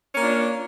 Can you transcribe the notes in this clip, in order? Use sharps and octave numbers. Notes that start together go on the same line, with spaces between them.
A#3 C#4 D4 F4